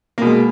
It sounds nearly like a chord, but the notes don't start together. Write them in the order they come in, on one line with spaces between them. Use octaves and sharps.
A#3 B2 G#3